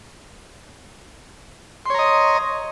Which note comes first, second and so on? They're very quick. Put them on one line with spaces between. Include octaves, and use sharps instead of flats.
C6 C#5 A#5 D#5